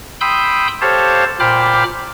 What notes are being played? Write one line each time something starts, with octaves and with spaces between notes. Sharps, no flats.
G5 B5 C6 D#6 E6 G6
G4 A4 C5 C#5 F5 A5
A#2 C5 G5 B5 D6 F6